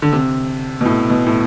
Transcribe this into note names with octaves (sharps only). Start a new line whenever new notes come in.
D3
C3
B2
A2
B2
A2